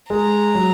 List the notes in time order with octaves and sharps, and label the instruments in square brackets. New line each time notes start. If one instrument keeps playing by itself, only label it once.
[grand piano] G#3 [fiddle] A#5
[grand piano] F#3